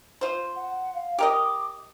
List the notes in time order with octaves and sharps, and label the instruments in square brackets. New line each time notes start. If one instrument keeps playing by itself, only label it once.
[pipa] F4 C5
[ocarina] F#5
F5
[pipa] G4 A#4 D#5 [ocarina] D6